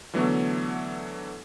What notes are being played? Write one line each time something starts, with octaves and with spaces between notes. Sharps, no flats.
D3 E3 F#3 A3 B3